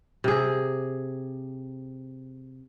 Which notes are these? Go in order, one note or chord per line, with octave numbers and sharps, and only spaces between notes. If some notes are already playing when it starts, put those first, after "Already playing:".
C3 G#4